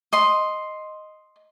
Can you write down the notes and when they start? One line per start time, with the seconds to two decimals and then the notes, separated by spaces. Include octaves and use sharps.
0.13 D#5 C6